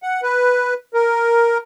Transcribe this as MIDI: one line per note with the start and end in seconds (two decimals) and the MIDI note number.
0.03 0.21 78
0.22 0.74 71
0.94 1.58 70